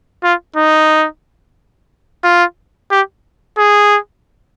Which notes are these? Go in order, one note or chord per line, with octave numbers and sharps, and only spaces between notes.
F4
D#4
F4
G4
G#4